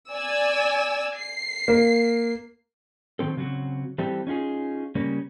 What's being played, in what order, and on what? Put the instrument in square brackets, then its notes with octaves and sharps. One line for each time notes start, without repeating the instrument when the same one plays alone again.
[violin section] D5 G#5 E6
C7
[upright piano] A#3
[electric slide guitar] D#3 F#3 C4 A4
C#3 F#3 C4 F#4
E3 G3 C4 G4 A4
C#4 D#4 F4 G#4
C#3 G3 A#3 C#4